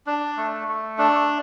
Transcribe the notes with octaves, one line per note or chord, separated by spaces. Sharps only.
D4
A3
A3
D4